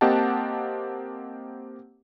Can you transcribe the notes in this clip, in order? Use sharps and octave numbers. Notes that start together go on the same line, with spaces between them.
A#3 C4 G4 D#5 F#5 A5